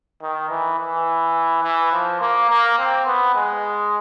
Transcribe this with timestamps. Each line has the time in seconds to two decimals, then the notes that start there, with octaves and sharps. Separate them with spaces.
0.22 D#3
0.50 E3
0.79 E3
1.64 E3
1.93 F3
2.21 A#3
2.49 A#3
2.78 C4
3.06 B3
3.35 G#3